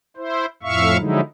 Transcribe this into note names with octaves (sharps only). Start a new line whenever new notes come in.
E4 C5
F2 A2 E5 F5 C#6
D3 F3 F#3 G#3 D#4 E4